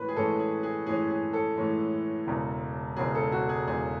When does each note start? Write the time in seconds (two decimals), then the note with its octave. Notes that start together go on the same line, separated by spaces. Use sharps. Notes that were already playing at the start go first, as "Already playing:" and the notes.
Already playing: A2 E3 G#3 C#4 B4
0.09 G#4
0.16 A2 E3 G#3 C#4 A4
0.40 G#4
0.63 G#4
0.86 A2 E3 G#3 C#4 G#4
1.10 G#4
1.33 A4
1.56 A2 E3 G#3 C#4
2.26 E1 E2 C#3 G#3
2.96 E1 E2 C#3 G#3 G#4
3.15 A4
3.32 F#4
3.49 G#4
3.67 E1 E2 C#3 G#3 G#4